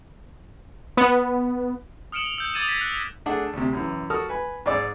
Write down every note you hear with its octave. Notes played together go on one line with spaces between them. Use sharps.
B3
D#6 F6 C#7 D7 E7 F#7
F7
E6 G6
D6 D#6 G#6 A6 D#7 E7
G#6 A#6 B6 E7
F#6
A3 D4 G#4 F#5
D2 C3
F#2 E3
F#4 A4 A#4 A5 D#6 F6
B4 G#5 B5
G#2 G#4 D5 D6 E6